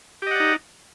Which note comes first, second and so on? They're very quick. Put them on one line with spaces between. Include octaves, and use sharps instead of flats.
G4 D#5 F#5 D5 D#4